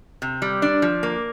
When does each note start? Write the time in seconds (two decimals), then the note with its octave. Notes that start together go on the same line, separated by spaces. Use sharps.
0.22 C3
0.42 G3
0.62 D4
0.82 F3
1.03 A#3